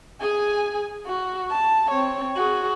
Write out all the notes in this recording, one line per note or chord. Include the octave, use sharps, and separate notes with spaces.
G#4 G#5
F#4
A5
C4 C#5
F#4 G#4